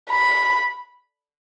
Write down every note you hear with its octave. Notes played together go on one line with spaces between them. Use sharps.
B5